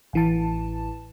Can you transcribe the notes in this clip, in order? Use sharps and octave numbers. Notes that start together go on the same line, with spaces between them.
A1 E3 A5